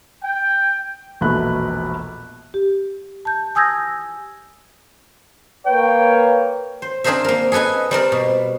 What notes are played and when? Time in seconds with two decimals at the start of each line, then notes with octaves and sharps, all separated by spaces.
0.22 G5
1.21 E1 A#1 B2 A3 B5 F#6
2.54 G4
3.25 A5 G6
3.55 G#5 D#6 E6 G6 G#6 A#6
5.66 A#3 B4 C#5 G5
6.82 C5
7.04 C4 D4 G#4 A#4 C5 E5
7.24 A#3 A#4
7.52 G#4 A4 B4 D#5 G#5
7.91 G3 C4 A#4 D5
8.12 B2